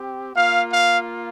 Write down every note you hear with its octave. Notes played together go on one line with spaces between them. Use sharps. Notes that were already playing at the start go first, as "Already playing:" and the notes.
Already playing: C4 G4
A#3 F4 F5
F5